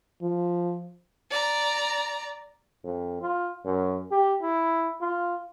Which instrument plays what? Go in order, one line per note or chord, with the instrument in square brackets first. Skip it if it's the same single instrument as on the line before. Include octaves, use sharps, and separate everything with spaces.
[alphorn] F3
[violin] D5 A#5
[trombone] F2
F4
F#2
G4
E4
F4